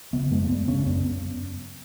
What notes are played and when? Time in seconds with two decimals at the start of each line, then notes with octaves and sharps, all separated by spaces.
0.13 C#3 B3
0.31 F#2 G#3
0.44 A#3
0.49 F#2 B3
0.67 C#3 C#4
0.78 C#4
0.86 F#2 B3